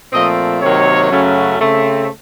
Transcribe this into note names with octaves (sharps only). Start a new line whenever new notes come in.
A#2 F3 A3 C4 D#5
C3 D#3 F#3 A#3 C#5
F#2 C#3 F#3 A3 C#4
C#3 A3 C4